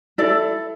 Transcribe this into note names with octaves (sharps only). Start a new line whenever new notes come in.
E4 A4 D5